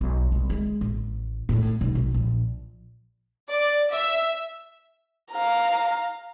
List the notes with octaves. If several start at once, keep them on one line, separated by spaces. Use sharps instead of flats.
B1
C2
G#3
A1
A2
B1
B1
A#1
D5
E5
F5 A#5